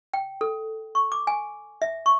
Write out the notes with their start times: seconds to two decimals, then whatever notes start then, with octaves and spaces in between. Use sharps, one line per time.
0.14 G5
0.41 A4
0.95 C#6
1.12 D6
1.27 G#5
1.82 E5
2.06 C#6